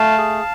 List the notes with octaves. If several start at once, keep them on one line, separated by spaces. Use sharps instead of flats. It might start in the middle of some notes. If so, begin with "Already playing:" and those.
Already playing: A3 F5 A5
G#4